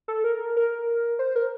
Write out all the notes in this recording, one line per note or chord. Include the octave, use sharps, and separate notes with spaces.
A4
A#4
A#4
C5
A#4